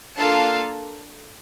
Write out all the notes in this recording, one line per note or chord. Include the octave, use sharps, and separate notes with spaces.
A#3 D4 F4 A4 F5 A5